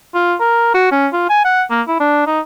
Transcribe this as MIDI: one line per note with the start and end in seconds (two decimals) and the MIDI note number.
0.14 0.34 65
0.40 0.70 70
0.74 0.91 66
0.92 1.07 61
1.13 1.28 65
1.29 1.43 80
1.45 1.63 78
1.71 1.81 58
1.87 1.96 64
2.00 2.26 62
2.27 2.40 63